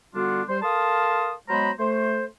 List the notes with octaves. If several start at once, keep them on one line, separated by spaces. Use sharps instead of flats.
D3 G3 B3 D4 F4 F#4
G3 C5
A4 A#4 F5 A5 C6 D#6
F#3 G#3 B3 C5 A#5 B5
A3 C5